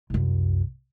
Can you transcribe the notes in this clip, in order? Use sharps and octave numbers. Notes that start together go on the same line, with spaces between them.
C2 F#2